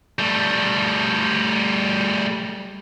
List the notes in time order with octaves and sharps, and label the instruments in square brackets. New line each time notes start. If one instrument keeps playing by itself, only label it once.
[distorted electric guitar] G3 A3